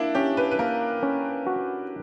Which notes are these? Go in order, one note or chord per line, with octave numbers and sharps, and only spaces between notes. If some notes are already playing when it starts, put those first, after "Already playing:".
Already playing: A#3 D4 E4
C#4 G4
B4
B4
A#3 A#4
C#4
F#4